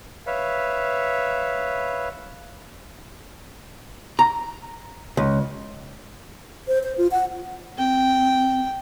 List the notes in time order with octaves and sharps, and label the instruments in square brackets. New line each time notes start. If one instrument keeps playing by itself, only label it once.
[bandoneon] B4 C#5 E5 F5
[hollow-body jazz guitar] A#5
C#2
[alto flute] C5
C5
F4
F#5
[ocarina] C4 [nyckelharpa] G5